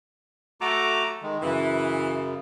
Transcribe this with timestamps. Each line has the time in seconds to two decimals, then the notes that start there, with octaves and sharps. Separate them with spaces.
0.61 F#3 A3 F#4 A#5 D6
1.22 D#3 G#3
1.42 F#2 C#3 E3